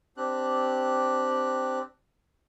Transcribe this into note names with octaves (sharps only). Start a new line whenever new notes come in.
C4 D4 G4 F#6